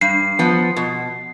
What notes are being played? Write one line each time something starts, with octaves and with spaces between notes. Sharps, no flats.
G2 C7
F3 B3
B2